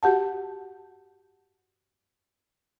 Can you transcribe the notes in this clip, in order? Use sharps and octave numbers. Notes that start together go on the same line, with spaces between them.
F#4 G4 F#5 A5